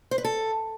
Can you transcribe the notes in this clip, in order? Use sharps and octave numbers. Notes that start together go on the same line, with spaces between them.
C5
B4
A4